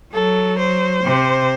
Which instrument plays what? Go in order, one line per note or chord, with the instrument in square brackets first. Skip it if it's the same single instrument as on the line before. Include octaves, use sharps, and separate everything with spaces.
[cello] F#3 [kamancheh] A4
[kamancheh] C5
[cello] C3